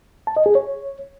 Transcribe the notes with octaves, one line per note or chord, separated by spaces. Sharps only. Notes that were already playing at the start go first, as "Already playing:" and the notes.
A5
D#5
G#4
C#5